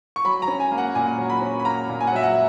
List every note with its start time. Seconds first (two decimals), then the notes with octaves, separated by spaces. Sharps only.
0.16 C#6
0.25 F#3 B5
0.42 A#5
0.48 C#4
0.60 G#5
0.71 A#3
0.78 F#5
0.95 A#2 G#5
1.18 F#3
1.30 B5
1.42 C#4
1.59 B5
1.65 A#3 A#5
1.89 A#2
2.00 G#5
2.07 F#5
2.12 F#3 E5
2.23 F#5